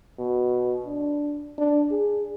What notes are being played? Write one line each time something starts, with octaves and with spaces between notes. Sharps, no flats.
B2
D4
D4
G#4